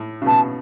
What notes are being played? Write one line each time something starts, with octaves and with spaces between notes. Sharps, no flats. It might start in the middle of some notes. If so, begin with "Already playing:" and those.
Already playing: A2
C#3
B2 A5